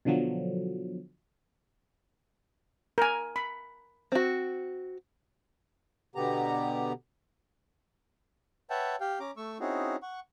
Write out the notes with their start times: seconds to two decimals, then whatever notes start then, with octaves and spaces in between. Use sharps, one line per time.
0.05 B2 D3 F3 F#3
2.98 A#4 G#5
3.36 B5
4.12 C4 F#4
6.16 B2 D3 B3 G4 A#5
8.70 B4 C#5 E5 F#5 G5 A5
9.01 G4 F5 G5
9.20 C#4 A#5 D6
9.37 A3 C#6 E6
9.60 C4 C#4 D#4 E4 F#4 G#4
10.03 F#5 C#6